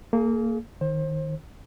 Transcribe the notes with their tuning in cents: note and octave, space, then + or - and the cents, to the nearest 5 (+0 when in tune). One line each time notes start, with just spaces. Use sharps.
A#3 -20 G#4 +30
D#3 +0 C5 +30